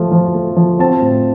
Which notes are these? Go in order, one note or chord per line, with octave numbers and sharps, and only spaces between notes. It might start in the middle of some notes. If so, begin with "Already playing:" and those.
Already playing: F3 A3
F3
A3
F3
C4 A5
A2